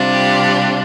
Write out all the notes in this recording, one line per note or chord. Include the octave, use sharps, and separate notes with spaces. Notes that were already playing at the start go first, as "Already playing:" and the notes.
Already playing: C3 G3 D4 F4
G4